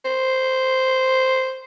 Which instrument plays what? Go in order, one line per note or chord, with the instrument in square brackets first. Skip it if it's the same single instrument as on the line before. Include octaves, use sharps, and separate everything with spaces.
[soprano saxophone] C5